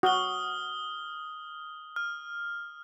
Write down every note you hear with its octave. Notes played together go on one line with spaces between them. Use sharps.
F#4 D#6 F6 G7
F6